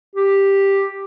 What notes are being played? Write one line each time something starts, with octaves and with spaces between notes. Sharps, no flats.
G4